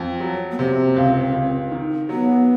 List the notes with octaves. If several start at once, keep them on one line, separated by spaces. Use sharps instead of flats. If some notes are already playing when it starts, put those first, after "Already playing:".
Already playing: F2
F#3
B3
C3 C4
C#2
C#2
D#3
F#3 B3